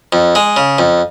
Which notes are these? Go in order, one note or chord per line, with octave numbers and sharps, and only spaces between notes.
F2
G#3
C#3
F2